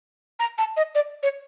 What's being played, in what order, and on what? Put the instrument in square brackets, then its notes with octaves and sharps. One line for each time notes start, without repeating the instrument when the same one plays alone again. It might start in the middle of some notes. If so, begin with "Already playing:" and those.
[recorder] A#5
A5
D#5
D5
C#5